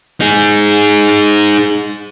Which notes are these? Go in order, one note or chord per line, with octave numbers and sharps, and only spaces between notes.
D#4 G#4